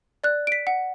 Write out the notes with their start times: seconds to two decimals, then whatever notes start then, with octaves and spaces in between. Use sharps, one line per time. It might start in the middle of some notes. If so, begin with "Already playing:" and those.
0.24 D5 F#6
0.47 D7
0.52 B6
0.67 F#5